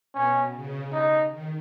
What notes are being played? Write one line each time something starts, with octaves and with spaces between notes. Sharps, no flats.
B2 C#4
C#3
D#4
D#3